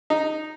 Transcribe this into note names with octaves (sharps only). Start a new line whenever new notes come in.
D#4